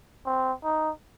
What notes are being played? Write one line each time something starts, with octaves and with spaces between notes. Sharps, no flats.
C4
D#4